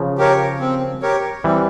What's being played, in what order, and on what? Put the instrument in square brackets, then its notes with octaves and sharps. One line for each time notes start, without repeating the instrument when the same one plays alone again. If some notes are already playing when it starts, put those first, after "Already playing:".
Already playing: [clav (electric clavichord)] C#3 F3
[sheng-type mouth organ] G4 A#4 C#5
C4
G4 A#4 C#5
[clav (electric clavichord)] E3 G3 [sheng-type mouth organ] C4